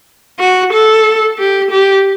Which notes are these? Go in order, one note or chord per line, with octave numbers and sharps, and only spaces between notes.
F#4
A4
G4
G4